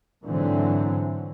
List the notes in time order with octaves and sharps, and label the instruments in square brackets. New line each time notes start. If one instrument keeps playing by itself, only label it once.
[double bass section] G#2 D3 E3 F#3 C4